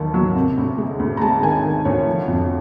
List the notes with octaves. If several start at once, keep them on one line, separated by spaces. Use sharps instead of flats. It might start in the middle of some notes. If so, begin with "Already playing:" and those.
Already playing: D#2 D#3 F#3 A5
F#3
C3
D2
G#3
D2
A#5
G#3 A5
D#3 G#5
D#3
D2 C#5
F3
F2